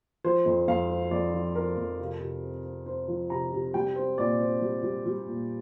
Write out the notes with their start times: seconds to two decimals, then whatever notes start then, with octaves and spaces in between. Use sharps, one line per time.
0.24 F3 C5
0.46 F2
0.68 F2 F5
0.90 C4
1.11 F2 D5
1.34 F3
1.55 C4 A#4
1.77 F2
2.00 C3
2.20 C3
2.43 C4
2.64 C4
2.86 C4 C5
3.08 F3
3.30 C3 A#5
3.53 C3
3.74 G3 G5
3.96 C4
4.18 A#2 D5
4.40 C4
4.62 G3
4.83 G3
5.06 G3
5.27 A#2